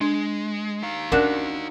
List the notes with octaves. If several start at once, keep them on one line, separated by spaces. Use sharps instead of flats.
G#3 D4
D#4 F5
C#4 D4 F#4 A#4 E5